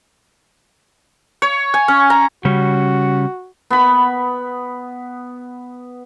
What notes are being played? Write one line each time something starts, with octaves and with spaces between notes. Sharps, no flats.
C#5
G#5
C#4
A#5
C#3 G3 C#4 F#4
B3 B5